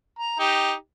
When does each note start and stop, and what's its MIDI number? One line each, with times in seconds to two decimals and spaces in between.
0.19 0.37 82
0.40 0.72 63
0.40 0.72 67